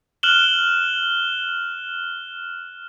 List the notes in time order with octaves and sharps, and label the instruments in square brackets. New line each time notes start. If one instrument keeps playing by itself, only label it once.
[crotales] F6 F#6 E7 F#7 G7